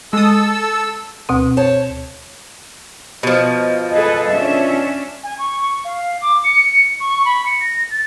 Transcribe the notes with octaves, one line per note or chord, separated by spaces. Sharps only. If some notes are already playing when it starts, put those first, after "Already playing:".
G#3 A4 D#6 E6
D2 B2 C4
C5 C#5 A5
B2 F3 D#5
G#4 A4 B4
C#4 D4 E5
G#5
C#6
F5
D6
C#7
C#6
B5
C#7
A#6
A6